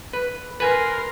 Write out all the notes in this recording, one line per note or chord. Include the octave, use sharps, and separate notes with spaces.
B4
A#4 B4 G#5 C6